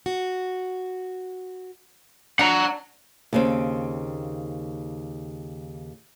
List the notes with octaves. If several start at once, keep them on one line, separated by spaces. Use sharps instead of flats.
F#4
D4 F#5 A#5
D#2 C#3 C4